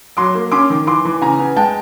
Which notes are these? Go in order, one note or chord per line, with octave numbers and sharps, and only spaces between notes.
F#3 C6 D6
A#3
C#4 C6 D6
D#3
E3 C6 D6
E3
C#3 G#5 A#5
B3
G#3 G5 A5